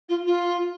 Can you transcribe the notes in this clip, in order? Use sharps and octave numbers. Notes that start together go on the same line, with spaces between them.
F4
F4